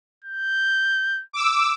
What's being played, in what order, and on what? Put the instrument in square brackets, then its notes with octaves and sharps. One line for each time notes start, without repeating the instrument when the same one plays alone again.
[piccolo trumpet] G6
[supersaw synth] D6 E6